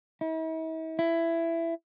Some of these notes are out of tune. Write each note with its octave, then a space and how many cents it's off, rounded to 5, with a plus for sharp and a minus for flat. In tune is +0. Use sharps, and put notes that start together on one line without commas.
E4 -45
E4 +15